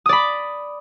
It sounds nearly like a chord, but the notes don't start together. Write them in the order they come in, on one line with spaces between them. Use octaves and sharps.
D#6 D5 B5